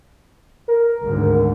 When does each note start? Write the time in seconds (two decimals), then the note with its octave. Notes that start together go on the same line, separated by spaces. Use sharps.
0.68 A#4
1.03 G#1 D2 G#2